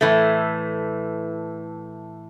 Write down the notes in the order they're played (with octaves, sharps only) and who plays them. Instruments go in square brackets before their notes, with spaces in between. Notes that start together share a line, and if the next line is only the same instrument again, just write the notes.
[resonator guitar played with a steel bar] A2 E3 A3